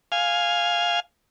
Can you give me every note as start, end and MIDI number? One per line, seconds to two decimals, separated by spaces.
0.12 1.00 77
0.12 1.00 80